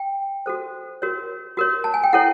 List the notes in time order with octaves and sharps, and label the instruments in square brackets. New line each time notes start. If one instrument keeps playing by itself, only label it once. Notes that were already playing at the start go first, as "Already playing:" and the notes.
Already playing: [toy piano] G5
F#4 A4 C5
F#4 A#4 C#5
F#4 A#4 C#5
A5
G#5
G5
E4 A4 C#5 F#5